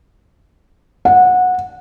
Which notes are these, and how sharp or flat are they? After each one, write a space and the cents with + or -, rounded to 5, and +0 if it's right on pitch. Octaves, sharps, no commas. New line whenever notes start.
F#5 -20